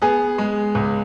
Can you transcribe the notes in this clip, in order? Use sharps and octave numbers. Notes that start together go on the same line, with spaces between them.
B3 G#4
G#3
C#2